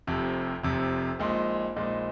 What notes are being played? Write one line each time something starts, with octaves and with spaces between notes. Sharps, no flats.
F1 F2 C3
F1 F2 C3
A#1 A#2 G#3 D#4
A#1 A#2 G#3 D#4